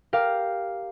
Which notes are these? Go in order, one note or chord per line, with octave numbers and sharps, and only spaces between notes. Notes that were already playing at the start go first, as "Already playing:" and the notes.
G4 A#4 F5